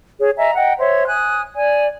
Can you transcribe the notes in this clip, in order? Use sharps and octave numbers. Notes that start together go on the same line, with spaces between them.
G#4 C#5
D#5 E5 G#5 A#5
D#5 F#5 G5
C5 C#5 E5
G#5 D#6 F#6
D5 G#5